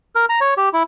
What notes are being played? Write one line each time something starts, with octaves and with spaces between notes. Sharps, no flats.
A#4
A#5
C#5
G4
E4